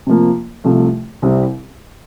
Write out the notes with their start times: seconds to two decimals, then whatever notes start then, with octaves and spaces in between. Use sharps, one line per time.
0.07 C3 F3 A#3
0.64 C2 C3 F3 A3
1.22 C2 C3 G3 C4 E4